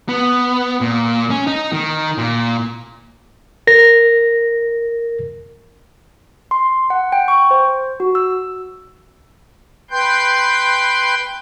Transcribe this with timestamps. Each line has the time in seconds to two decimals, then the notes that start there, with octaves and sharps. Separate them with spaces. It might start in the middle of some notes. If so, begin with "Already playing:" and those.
0.09 B3
0.81 A#2
1.30 C#4
1.47 D#4
1.73 D#3
2.18 A#2
3.67 A#4 A#6
6.51 C6
6.90 F#5
7.12 G5
7.28 C#6
7.51 C5
8.00 F#4
8.15 E6
9.91 B4 G5 C6 G6